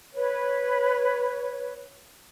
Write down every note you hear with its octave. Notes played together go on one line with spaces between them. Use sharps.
B4 C#5